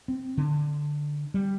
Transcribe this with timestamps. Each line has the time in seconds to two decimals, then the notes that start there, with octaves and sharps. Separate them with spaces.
0.08 C4
0.37 D3
1.34 G3